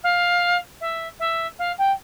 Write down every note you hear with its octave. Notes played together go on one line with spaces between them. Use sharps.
F5
E5
E5
F5
G5